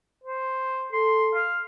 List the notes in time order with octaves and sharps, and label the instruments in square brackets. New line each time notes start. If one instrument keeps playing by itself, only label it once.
[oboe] C5
[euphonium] A4 [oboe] C6
[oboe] F5